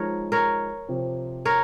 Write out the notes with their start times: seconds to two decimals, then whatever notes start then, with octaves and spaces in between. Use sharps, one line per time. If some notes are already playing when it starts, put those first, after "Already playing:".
Already playing: F3 G#3 D#4 A#4 C#5
0.32 A#4 C#5
0.88 C3 F3 C4
1.45 A#4 C#5